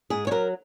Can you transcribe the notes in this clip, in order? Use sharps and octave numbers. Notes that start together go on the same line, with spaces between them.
G#2 G#4
C#5
F#3 A#4